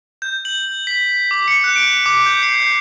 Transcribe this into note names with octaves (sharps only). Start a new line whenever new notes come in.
G6
F#7
B6
D6
C#7
F#6
D7
D6
G6
C7
G6